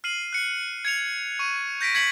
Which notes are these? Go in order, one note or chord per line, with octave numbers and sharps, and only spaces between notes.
F6 C7 D#7 F#7
F#6 C#7
G#6 C#7 F7
C#6 D#7
G6 A#6 B6 D7
G#6 B6 C#7 F#7